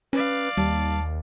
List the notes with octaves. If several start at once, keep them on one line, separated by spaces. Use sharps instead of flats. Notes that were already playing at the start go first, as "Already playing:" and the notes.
C#4 B4 D5 F5
D#2 G3 A5